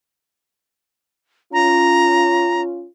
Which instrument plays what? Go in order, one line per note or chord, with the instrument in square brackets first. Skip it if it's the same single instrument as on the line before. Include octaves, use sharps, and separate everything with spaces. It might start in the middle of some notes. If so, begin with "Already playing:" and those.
[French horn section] C#4 F4 [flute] A#5